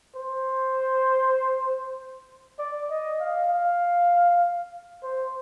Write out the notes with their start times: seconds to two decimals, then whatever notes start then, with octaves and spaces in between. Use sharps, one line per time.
0.16 C5
2.59 D5
2.90 D#5
3.20 F5
3.50 F5
5.03 C5